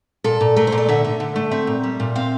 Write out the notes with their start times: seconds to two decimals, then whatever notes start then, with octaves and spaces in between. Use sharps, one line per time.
0.24 A#2 A4
0.41 A#2
0.56 A3 A#4
0.67 C5
0.72 A#2
0.78 D5
0.89 D3 E5
1.04 D3
1.20 D3
1.36 A3
1.51 C4 E5
1.67 A#2
1.84 G3
2.00 A#2
2.15 C4 F5